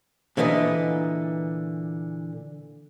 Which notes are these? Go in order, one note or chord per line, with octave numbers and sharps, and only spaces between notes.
A#2 D3 E3 B4 D#5